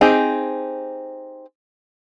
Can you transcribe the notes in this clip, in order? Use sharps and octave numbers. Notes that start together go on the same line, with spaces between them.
C4 D#4 G4 G#4